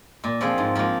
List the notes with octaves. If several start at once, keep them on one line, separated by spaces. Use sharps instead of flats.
A#2
F3 C4 F4 G#4
G#2
F3 A#3 F4